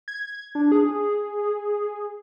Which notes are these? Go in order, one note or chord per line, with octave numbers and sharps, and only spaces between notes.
G#6
D4
G#4